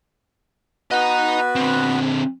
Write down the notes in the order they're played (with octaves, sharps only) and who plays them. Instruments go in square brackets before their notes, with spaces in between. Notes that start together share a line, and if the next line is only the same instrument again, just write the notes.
[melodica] B3 F#4 B4 [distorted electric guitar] D#5 A#5
[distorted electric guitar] D3 C4